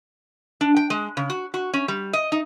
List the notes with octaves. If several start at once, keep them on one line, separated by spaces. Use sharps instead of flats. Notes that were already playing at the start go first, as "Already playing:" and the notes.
D4
G5
G#3
C#3
F#4
F#4
C#4
G3
D#5
D#4